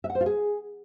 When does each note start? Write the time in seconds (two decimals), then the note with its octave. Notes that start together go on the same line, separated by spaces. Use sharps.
0.04 E5
0.10 F#5
0.15 C5
0.21 F4
0.26 G#4